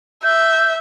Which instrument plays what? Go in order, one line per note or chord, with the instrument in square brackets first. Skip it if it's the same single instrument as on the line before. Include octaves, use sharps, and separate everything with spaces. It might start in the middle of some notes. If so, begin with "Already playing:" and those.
[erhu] E5 [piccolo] G6